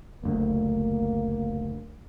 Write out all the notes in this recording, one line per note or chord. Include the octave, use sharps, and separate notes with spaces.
F#1 D2 D3 A#3